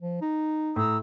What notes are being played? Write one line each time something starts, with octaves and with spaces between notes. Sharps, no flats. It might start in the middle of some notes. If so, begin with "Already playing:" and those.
F3
D#4
A2 A#5 D#6 E6